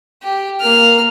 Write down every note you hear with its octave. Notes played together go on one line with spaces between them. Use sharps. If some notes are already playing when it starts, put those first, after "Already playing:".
G4
A#3 F6